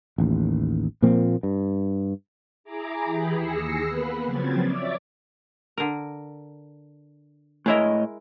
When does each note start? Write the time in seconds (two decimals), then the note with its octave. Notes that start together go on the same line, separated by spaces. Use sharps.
0.18 A1 D#2
1.02 A#2 F3 A#3 C4
1.43 G2
2.64 E4 G#4 A#5 D6
3.04 E3 G4 G#4 B5
3.34 D#2 G#4 E6 A#6 C7 C#7
3.84 A#3 B3 B4 B5
4.24 C#3 F3 F#3 C4 G#6 A6
4.63 C#5 D5 E5 D6
5.78 D3 A#4
7.66 A2 G#3 E4 A#4 C#5 D#5